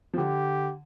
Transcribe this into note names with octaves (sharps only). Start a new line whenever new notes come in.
F3
D3 G4